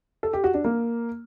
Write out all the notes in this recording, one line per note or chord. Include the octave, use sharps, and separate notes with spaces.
A4
G4
F#4
D4
A#3